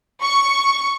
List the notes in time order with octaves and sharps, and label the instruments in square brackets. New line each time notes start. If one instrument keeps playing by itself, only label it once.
[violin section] C#6